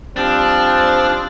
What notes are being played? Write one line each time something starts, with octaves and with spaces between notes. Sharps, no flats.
F3 G3 C4 D4